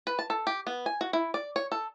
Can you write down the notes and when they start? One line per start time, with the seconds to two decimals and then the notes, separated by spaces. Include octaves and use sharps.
0.07 B4
0.19 A5
0.30 A4
0.47 G4
0.67 B3
0.86 G#5
1.01 F#4
1.13 E4
1.34 D5
1.56 C#5
1.72 A4